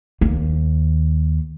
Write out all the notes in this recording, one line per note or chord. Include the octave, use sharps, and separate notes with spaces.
D#2